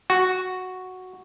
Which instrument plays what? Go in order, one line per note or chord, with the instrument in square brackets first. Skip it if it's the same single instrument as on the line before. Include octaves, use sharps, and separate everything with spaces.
[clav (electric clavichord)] F#4